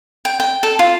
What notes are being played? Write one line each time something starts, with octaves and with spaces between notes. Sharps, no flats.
G5
G5
A4
F4